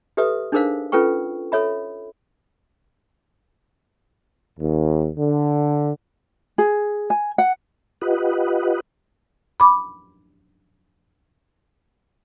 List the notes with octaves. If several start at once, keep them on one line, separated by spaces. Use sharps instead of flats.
G4 A4 B4 E5 D#6
D4 D#4 G#4 A#4 C5 F5
C#4 F4 A4 B4 G5 C#6
A4 C#5 E5 B5
D#2
D3
G#4
G#5
F#5
F4 G4 B4 D#5 F#5
B5 D6